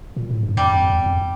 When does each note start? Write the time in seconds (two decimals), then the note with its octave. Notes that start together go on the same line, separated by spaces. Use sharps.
0.16 A#2
0.30 A2
0.43 G2
0.57 F2 G3
0.73 F2
0.90 E2
1.06 F2